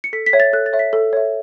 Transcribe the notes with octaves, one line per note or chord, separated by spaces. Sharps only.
C#7
A4 B6
B6
C#5 E5
A6
A4 F#6
A6
C#5 E5
B6
A4
C#5 E5